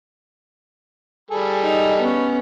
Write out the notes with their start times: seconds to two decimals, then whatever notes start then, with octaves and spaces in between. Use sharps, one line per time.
1.31 G3 G#4 A4
1.62 D#4
1.99 B3 C#4